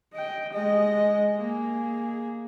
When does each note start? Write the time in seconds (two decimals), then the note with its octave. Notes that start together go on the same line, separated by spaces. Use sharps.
0.14 D#5 G5
0.53 G#3 D#5
1.38 A#3 G#4